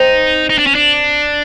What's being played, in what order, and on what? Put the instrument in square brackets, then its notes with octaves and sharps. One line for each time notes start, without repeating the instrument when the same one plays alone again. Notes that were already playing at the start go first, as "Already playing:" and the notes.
Already playing: [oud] C4 [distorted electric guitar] D#4
[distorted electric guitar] D#4
D4
C#4
D4